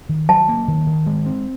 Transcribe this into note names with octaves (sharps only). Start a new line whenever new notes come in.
D#3
F#3 A5
A#3
D#3
D#3
G#3
C4